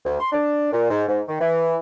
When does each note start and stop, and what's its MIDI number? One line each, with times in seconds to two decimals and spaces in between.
0.06 0.18 38
0.20 0.32 84
0.32 0.70 62
0.72 0.90 46
0.91 1.04 44
1.08 1.22 44
1.28 1.38 51
1.41 1.76 52